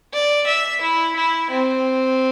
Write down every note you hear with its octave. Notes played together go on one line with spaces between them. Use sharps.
D5
E5
E4
E4
C4